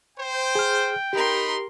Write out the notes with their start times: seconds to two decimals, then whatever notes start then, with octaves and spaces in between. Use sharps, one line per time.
0.18 C5 G5
0.55 G#4 F6
1.13 D#4 G4 A#4 B5 C6